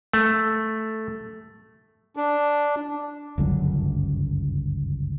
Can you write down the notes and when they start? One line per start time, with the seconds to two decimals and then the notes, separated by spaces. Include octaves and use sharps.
0.13 A3
2.16 D4
3.38 G1 C#2 F#2